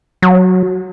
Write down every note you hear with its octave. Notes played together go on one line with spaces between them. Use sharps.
F#3